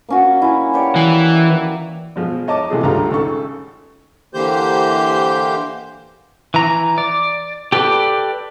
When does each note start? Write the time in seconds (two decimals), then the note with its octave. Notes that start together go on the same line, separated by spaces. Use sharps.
0.09 A#3 C#4 F#4
0.42 E4 G#5
0.74 G4 C#5 D5
0.96 E3
2.16 B2 F3 G#3
2.48 C#5 D#5 A5 D6
2.70 C3 E3 G#3 A3 F4 G#4
2.83 C#2 G2 A3 F4 G4 A#5
3.10 G#1 C#3 A4 C#6
4.34 D3 E3 A#3 G4 C5 G6
6.54 E3 A#5
6.98 D5
7.72 G4 A4 B4 D5